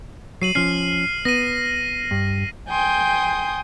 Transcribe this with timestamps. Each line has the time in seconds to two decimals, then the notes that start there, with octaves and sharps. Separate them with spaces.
0.42 F#3 C7 D#7 F#7
0.55 F3 C#4 F6 C7
1.25 B3 A#6 D#7
2.11 G2
2.70 G5 G#5 C6 D#6 G6